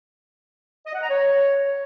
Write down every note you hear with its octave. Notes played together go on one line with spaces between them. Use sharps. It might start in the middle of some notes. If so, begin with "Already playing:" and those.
D#5
F#5
A#5
C#5